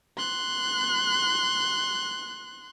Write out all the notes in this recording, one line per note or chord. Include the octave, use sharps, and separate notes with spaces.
C6 F#6